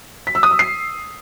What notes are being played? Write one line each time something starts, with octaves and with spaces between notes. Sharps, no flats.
B6
E6
D#6
E6
C7